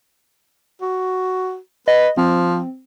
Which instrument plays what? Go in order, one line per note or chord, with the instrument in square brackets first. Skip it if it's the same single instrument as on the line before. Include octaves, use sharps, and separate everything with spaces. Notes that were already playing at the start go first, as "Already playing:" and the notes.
[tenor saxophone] F#4
[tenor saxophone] B4 [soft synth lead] D#5
[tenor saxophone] F3 [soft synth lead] C4